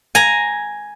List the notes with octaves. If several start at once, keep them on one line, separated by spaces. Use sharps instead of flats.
G#5 A#5